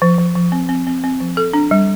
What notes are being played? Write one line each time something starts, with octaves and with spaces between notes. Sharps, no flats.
F3
F3
F3
C4
C4
C4
C4
F3
A4
D4
G3